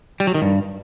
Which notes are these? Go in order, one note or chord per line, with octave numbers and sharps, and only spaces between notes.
G3
F#3
D#3
G2